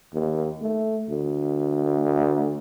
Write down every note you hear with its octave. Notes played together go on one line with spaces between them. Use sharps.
D#2
A3
D2